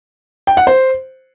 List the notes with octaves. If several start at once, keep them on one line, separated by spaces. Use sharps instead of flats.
G5
F#5
C5